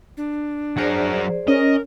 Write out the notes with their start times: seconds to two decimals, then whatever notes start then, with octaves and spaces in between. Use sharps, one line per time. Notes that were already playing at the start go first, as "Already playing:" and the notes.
0.17 D4
0.77 F#3 G#4 A#4 C5 D5
1.48 C#4 A#4 D#5